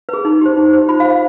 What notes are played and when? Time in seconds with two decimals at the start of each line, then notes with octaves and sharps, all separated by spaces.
0.09 G#4 B4
0.25 D#4
0.41 G4 C5
0.57 D#4
0.73 G4 C5
0.89 F4 B5
1.00 F5
1.05 C5
1.10 F5